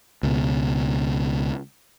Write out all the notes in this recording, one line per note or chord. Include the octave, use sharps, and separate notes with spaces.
C#2 B2